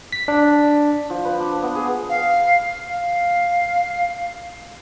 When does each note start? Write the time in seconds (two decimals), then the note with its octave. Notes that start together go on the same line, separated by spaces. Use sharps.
0.12 B6
0.28 D4
1.10 F3
1.25 B4
1.40 D4
1.62 B3
1.75 G#4
2.09 F5
2.88 F5